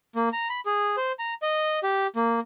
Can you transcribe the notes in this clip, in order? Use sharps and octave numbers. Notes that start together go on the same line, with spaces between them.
A#3
A#5
B5
G#4
C5
A#5
D#5
G4
A#3